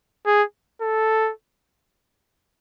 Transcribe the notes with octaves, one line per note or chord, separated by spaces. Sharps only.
G#4
A4